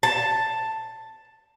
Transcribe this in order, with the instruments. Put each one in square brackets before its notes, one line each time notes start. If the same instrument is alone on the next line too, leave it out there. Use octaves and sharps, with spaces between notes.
[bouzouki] A5